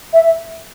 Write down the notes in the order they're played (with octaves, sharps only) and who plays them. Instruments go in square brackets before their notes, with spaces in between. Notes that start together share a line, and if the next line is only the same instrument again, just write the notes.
[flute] E5